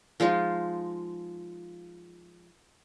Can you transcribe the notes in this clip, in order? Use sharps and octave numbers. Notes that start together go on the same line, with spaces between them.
F3 G#3 D#4 F4